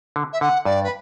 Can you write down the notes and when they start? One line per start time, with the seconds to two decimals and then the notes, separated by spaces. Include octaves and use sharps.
0.16 D3
0.33 E5
0.41 D3 F#5
0.65 G2 D5
0.83 B4